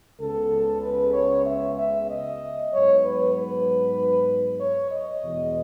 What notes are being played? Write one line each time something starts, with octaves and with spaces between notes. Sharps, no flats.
C#2 C#3 G#3 B3 A4
B4
C#5
E5
E5
D#5
G#2 F#3 B3 C#5
B4
B4
C#5
D#5
E2 B2 G#3 B3